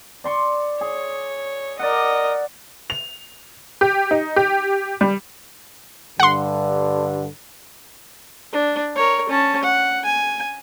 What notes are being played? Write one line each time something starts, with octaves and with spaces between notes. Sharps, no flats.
D5 C6 C#6
G#4 C#5
A#4 D5 D#5 F#5
F7
G4
D#4
G4
G3
G2 D3 F#5 C6
D4
A#4 C#5
C#4 A5
F#5
G#5